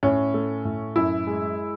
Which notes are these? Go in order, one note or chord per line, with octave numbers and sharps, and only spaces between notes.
A2 C#4
A3
A2
F#2 E4
G#3